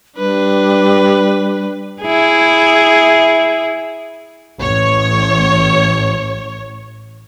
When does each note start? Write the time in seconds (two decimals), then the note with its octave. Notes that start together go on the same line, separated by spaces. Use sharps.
0.18 G3 D4 B4
2.03 E4 G#4
4.59 A1 C#5